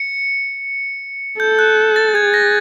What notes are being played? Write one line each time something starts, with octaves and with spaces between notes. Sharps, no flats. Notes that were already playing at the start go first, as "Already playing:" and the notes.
Already playing: C#7
A4 G6
F#6
A6
G#4 G#6
A#6